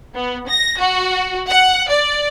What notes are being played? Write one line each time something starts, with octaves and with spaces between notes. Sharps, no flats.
B3
A#6
F#4
F#5
D5